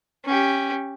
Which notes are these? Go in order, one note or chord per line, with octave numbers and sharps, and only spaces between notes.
C#4 G4